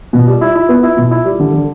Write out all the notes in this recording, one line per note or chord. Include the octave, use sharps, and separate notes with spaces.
B2
G3
E4
E4
B3
E4
B2
E4
G3
D3
D3